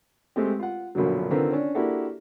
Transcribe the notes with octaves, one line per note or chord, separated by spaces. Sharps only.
G#3 A3 C4 G4
F4 F#5
A#1 F#2 B2 D3 F#3
D3 D#3 C4 F4 A#4 B4
C#4 D4
A#3 D4 E4 F#4 G4 A4